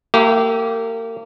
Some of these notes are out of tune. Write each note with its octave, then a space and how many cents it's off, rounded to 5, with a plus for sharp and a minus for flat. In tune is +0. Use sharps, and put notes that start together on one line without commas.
A#3 -40 E4 +0 G4 -20